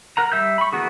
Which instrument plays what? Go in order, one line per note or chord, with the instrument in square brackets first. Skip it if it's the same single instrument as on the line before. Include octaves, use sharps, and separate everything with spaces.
[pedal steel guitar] A#4 F#5 A#5
G3 E5 E6 G6
B5 C#6
E3 A#3 B3 F#4 G#4